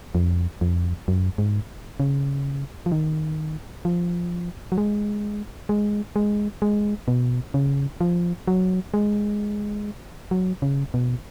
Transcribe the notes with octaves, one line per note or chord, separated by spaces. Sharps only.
F2
F2
F#2
G#2
C#3
F3
D#3
F3
F#3
G#3
G#3
G#3
G#3
B2
C#3
F3
F#3
G#3
F#3
C#3
B2